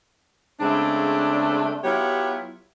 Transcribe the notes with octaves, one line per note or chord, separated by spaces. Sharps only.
C#3 G#3 A3 C4 D4
F#3 B3 E4 F4 G4 C#5